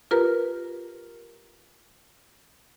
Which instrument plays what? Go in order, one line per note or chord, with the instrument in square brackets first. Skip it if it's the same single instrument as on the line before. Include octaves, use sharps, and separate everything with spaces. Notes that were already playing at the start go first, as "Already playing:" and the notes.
[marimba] F4 G4 A#4 B4 A#5